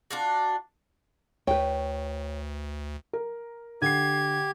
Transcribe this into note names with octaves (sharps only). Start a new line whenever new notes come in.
D4 F4 F#4
D2 B4 C#5 G5
A#4
D3 G4 G#6 C7